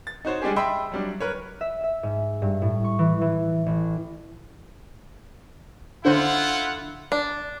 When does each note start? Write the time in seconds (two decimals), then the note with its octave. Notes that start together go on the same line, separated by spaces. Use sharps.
0.07 A6
0.25 D#4 F#4 C5 C#5
0.41 G3 G#3 D4 G4 G#4
0.56 D#5 E5 G5 B5 C6 E6
0.92 F#3 G3 D4
1.20 A#4 B4 C#5
1.61 E5
1.84 E5
2.03 G#2
2.42 G2
2.62 A2
2.84 C#6
2.99 E3
3.21 E3
3.66 A1
6.05 D3 E4 F4 C5 F#5
7.12 D4